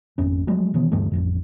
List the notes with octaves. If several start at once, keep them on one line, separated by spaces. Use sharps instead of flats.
G#1 F2 C#4
F3 F#3 G#3 A3
B2 D#3 E3 B3
D2 G2 E3 A3
A1 F2 A#2